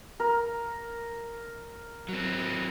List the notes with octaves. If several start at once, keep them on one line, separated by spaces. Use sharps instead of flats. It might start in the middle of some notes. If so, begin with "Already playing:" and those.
A#4
F#3 C4